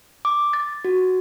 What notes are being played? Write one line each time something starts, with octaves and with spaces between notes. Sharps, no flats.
D6
A6
F#4